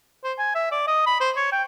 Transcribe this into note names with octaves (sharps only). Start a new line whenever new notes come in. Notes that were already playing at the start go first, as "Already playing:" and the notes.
C5
G#5
E5
D5
D#5
B5
C5
C#5
G5